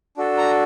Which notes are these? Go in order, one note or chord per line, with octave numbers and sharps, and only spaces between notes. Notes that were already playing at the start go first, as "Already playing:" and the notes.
D4 F#4 A4
A#5